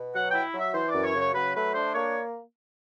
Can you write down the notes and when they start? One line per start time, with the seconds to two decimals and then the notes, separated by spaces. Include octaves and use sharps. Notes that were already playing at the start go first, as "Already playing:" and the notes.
Already playing: B2
0.14 F#3 F#5
0.29 E4 G5
0.54 F#3 E5
0.74 E3 C5
0.89 F#2 D5
1.04 C#5
1.14 C#3
1.19 C#5
1.34 F#3 B4
1.54 A3 B4
1.74 D4 C5
1.94 A#3 C#5